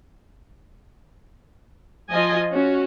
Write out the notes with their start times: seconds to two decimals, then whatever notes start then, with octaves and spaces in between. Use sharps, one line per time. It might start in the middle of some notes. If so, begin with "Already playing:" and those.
2.11 F3 F4 D#5 G#5
2.50 C#4 F#4